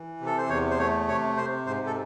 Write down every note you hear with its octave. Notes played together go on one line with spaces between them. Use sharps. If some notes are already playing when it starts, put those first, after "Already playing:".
Already playing: E3
C3
A4
C5
E2 C#5
C5
A3 C#5
C3 C#5
C3 C5
G#2 C5
A4